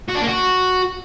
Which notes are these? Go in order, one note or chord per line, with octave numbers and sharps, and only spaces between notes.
F#4
D4
A#3
F#4